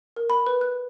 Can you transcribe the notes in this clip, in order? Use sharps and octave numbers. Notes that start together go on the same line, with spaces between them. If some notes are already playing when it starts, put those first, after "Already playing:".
A#4
B5
B4
F#6